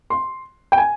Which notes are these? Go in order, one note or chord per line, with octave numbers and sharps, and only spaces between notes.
C6
G5
G#5